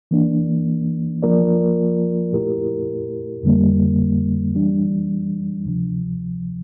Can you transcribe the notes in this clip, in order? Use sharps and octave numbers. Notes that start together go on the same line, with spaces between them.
E3 A#3 D4
F3 A#3 F4 A#4 D5
A#2 A3 E4 G4 A#4
F2 D3 G3 A#3
E3 G3 D4
D2 C3 F3